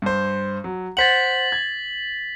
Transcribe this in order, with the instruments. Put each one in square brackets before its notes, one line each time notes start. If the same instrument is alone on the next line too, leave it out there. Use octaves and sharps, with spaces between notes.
[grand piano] G2 C5
F#3
[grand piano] C5 F#5 [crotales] A6 B6 F#7
[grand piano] G#6